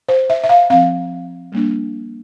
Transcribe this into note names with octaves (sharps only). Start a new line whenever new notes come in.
C5
E5
E5
F5
F3 C4 F5
G3 A#3 D4